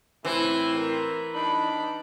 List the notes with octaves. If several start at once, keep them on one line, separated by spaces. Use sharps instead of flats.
A2 E3 C4 E4
A#4
D4 D#4 B5